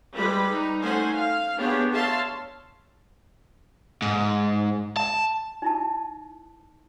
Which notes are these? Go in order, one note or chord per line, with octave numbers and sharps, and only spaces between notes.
G3 G#3 B4 B5
D#4
A3 C#4 D#4 C5 F#5 G#5
F5
B3 D4 G4 G#4 C#5
C#5 E5 F5 A5 C6
G#2
A5
D#4 E4 A5